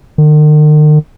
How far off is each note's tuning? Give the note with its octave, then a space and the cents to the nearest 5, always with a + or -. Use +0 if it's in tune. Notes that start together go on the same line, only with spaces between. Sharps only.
D#3 -45